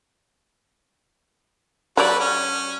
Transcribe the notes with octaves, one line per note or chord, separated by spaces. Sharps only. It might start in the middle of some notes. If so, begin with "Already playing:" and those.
F#3 F#4 G4 A4 B4 D5
C#4